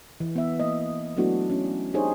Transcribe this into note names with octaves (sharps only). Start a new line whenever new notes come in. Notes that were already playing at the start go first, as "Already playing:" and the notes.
E3
B3 E5
A#3 D#5
F#3 A3 B3 D4 E4 F#4
C#4
D4 D#4 G4 G#4 C5 C#5